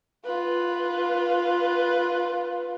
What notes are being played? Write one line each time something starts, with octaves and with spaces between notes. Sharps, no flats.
F4 B4